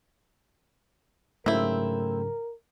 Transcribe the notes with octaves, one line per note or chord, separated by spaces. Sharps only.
G#2 C#3 F#3 A3 C4 E4 A#4